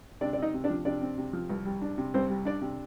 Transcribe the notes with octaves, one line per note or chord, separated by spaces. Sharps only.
C3 D4 D5
D5
C4 D#4 D#5
C3
D4 D5
F3
C3 D4 D5
C4
C3
F3
C2
G3
D4
C3
C2 C4 C5
G3
D4 D5
C3